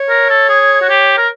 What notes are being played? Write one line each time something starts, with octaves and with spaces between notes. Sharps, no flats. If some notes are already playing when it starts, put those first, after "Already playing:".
Already playing: C#5
A#4
A4
G#4
F#4
G4
A#4